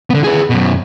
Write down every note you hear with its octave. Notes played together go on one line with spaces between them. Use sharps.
D3 B3
G#4 B4
F#2 B2